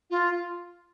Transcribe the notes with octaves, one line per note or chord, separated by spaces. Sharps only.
F4